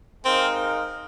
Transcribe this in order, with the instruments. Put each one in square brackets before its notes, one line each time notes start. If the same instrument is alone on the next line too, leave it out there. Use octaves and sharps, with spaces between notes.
[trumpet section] G#3 D#4 A#4 F5 [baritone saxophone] C4